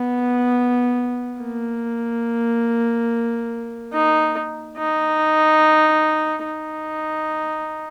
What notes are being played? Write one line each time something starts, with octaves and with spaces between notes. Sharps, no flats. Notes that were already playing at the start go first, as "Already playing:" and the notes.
Already playing: B3
A#3
D#4
D#4
D#4